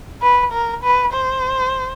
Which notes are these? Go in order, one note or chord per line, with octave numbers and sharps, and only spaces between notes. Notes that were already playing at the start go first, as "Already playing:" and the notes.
B4
A#4
B4
C5